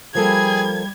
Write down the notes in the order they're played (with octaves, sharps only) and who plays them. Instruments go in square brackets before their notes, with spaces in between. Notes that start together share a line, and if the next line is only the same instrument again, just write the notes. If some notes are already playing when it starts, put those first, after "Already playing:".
[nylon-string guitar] F3 A#3 A4 [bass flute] G3 [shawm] G#4 [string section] G#6